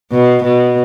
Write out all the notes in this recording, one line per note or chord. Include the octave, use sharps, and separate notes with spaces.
B2
B2